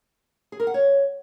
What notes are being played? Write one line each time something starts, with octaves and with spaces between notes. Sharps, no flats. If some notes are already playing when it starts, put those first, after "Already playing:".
G#4
A#4
F#5
C#5